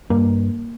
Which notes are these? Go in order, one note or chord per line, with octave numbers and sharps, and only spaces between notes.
G2 A#3